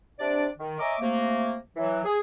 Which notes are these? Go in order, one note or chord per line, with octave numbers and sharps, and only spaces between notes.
C3 D4 D5
D#3
C#5 D#5 E5 G#5 A#5 D6
C3 A3 A#3
E3 F#3
G#4